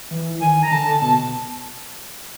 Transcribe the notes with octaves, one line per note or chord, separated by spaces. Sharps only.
E3
D#3 G#5
A#5
D3 A5
B2 A5